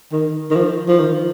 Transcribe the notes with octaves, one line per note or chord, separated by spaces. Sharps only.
D#3
D#3
F3
F3
D#3